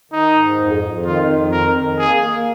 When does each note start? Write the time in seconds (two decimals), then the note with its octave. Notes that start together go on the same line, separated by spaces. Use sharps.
0.12 D#3 D#4
0.35 G#2
0.59 F2
0.82 F2
1.05 D#3 F4
1.29 F2
1.52 D#3 A#4
1.76 D#3
1.99 A#3 G#4
2.23 A#3